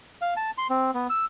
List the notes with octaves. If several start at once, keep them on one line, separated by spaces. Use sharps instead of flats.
F5
A5
C6
C4
B3
E6